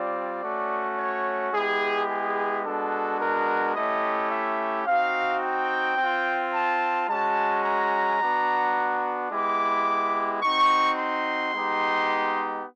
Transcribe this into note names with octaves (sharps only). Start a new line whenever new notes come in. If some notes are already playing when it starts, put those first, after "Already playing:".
Already playing: G3 C4 F4 D5
A3 C#4 F#4
C#5
G#3 B3 E4 G4 G#4
G#4
G#3 B3 D4 F#4 A4
A#4
A3 C#4 E4 G4 D#5
E5
C4 D#4 F#4 F5
G5
C4 F4
A5
G#3 C#4 F#4 A5
A#5
B3 D4 F#4
G#3 B3 E4 G4 D6
C4 D#4 F#4 C#6
C6
G#3 B3 D#4 G4